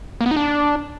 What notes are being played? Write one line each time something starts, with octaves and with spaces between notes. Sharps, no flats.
A#3
B3
D#4
D4